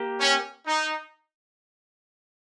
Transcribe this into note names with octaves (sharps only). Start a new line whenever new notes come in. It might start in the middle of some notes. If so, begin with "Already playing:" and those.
Already playing: A#3 G4
C#4
D#4